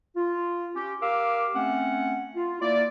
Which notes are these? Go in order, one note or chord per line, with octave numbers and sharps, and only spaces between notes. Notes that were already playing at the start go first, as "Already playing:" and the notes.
F4
C#4 G4
G4 A#4 F5 D6 E6
A3 C4 C#4 F#5
F4
A#3 E4 D5